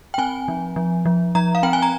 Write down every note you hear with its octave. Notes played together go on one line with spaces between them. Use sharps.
G5
C4 G#5
F3
F3
F3
F3 A#5
F5
C4 G5
G#5
A#5